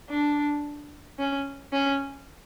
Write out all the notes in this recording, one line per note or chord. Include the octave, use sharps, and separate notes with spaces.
D4
C#4
C#4